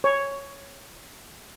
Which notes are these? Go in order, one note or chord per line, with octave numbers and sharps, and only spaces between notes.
C#5